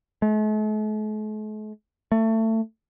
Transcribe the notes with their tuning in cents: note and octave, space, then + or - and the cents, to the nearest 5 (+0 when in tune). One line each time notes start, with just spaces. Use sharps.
A3 -45
A3 +25